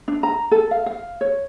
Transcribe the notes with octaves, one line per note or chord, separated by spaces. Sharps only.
D4
A#5
A4
F5
F5
C#5